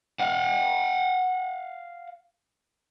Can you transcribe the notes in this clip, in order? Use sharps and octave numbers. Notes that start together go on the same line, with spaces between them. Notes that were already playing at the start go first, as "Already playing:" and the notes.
F5 F#5